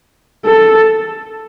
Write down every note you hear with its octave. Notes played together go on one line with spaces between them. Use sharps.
A4